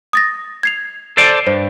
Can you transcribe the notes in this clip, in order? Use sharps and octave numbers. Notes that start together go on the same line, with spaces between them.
D#6 A6 A#6
G#6 C7 F7
A4 C5 D5
G2 C5